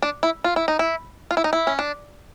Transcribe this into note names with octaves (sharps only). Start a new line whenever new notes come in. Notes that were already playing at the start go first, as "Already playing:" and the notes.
D4
E4
F4
E4
D#4
E4
F4
E4
D#4
E4
C#4
D4